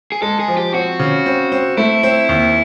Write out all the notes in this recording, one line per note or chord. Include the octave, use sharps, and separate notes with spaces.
G#4
G#3 A4
G#4
F3
G4
C4 F#4
C#3
C4
C4
A3 E4
C4
D#2